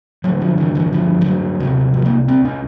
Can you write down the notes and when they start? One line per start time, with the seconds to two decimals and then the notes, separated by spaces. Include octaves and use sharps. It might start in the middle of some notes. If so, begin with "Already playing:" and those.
0.24 G1 G2 D3 F#3
0.41 F3
0.58 E3
0.75 E3
0.93 F3
1.21 G3
1.26 F#3
1.60 C2 C3
1.94 F3
2.05 A#3
2.28 C4
2.45 C#4